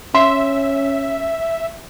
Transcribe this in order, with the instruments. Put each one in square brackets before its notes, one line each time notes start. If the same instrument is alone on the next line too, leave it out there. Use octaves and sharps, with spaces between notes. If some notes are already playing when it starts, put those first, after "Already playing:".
[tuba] C#4 [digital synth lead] E5 [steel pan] C6